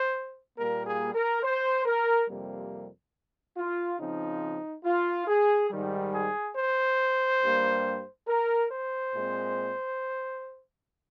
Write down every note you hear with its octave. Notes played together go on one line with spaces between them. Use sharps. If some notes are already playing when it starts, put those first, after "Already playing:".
Already playing: C5
A#2 G3 A#3 A#4
G#4
A#4
C5
A#4
F2 C3 G3 A#3
F4
C#3 F3 C4 D#4
F4
G#4
G#2 D#3 G3
G#4
C5
G2 G3 A#3
A#4
C5
A#2 G#3 C4